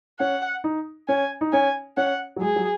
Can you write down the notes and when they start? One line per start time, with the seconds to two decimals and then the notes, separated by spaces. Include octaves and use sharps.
0.20 C#4 F#5
0.64 D#4
1.08 C#4 G#5
1.41 D#4
1.53 C#4 G#5
1.97 C#4 F#5
2.36 F#3
2.41 G#3 G#4
2.56 F#3